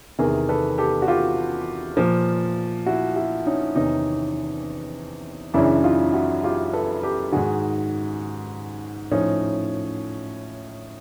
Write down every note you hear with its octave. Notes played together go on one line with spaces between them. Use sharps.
E2 C3 D#3 G#4 A#4
A4 B4
G4 A4
F#4
F4 G4
A#2 F3
E4 F#4
E4 F#4
C#4 D#4
E2 C3 D#3 C#4 D#4
F#2 C#3 E3 D4 E4
D#4 F4
E4 F#4
F4 G4
A4 B4
G4 A4
G#2 D#3 F#4 G#4
A2 F3 C#4 D#4